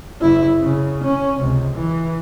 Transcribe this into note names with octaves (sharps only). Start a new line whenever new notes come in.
F#1 E4
C#3
C#4
C#2 C3
E3